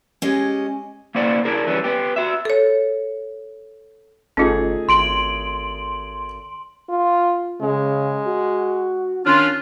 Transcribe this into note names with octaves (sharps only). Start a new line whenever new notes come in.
G#3 C#4 G4 D#5
A#3 E4 C5 D5 F#5
D4 E4 G#4 A#4
E3 G3 C#4
B3 G4
F#4 E5
A4 C#5
G1 A3 C#4 D#4 F4 G#4
G#1 C6 D7 F#7
F4
C#3 G#3
F#4
D#3 C#4 D4 F4